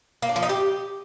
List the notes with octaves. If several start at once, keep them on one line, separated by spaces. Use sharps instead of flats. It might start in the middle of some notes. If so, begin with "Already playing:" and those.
A#3
D4
F3
D#4
G4